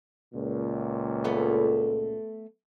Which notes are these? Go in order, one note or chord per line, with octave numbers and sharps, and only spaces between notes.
C#2 A#2
A3 B3